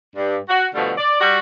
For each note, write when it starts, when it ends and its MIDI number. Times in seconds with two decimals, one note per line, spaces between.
0.16 0.36 43
0.48 0.66 66
0.75 0.92 43
0.75 0.92 47
0.75 0.92 50
0.75 0.92 53
0.75 0.92 55
0.75 0.92 57
0.97 1.16 74
1.20 1.39 55
1.20 1.39 66